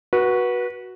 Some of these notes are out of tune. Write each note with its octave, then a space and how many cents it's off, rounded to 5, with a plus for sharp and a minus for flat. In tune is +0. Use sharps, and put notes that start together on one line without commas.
F#4 +0 B4 -25